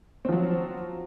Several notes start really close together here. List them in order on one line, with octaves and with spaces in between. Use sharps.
C4 F3 F#3